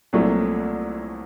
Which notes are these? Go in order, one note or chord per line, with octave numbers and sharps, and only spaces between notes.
C2 A#2 F#3 A3 C4